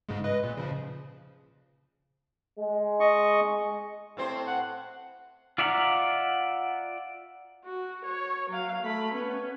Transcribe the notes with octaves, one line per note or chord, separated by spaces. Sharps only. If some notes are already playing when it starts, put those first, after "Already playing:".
G#2 C#3 G#3
B4 D#5
A#2
C#3 F3
G#3
D#5 C#6
A2 C4 C5
F#5
F4 D5 E5 F#5 A#5
F#4
C#5
F#3 F5
A3 B5
B3 C#4